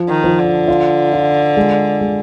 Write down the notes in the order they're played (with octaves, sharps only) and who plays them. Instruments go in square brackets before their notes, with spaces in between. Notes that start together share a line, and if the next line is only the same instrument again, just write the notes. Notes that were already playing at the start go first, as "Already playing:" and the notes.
Already playing: [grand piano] F3
[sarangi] D#3
[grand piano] F3
[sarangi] D3
[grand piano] F4
F4
G#3
G#3